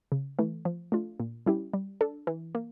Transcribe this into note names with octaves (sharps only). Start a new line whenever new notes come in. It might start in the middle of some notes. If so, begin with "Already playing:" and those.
C#3
E3 A3
F3
A3 D4 F4
A#2
G3 C#4 E4 G4
G3
D4 A4
E3
A#3